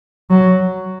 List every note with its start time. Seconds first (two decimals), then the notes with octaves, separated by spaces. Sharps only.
0.30 F#3